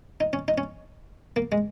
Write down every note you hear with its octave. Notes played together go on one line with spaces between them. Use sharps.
D#4
C#4
D#4
C#4
A#3
G#3